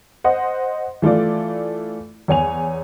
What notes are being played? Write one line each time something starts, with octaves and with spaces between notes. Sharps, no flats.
C5 D#5 F#5
E3 A3 F4 D5
E2 C#5 G#5 F7